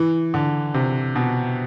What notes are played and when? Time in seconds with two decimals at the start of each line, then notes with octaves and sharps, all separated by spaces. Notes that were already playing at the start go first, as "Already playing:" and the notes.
Already playing: E3
0.34 D3
0.74 C3
1.15 B2